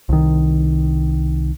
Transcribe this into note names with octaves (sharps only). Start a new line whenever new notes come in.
C2 D#3